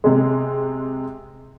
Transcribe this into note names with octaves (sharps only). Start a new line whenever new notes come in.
C3 G#3